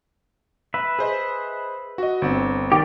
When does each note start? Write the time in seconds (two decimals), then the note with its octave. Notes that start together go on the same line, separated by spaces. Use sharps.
0.74 B4 E5
0.99 G#4 C5 D#5
1.98 F#4 D#5
2.22 G1 C4
2.72 D#3 G4 D5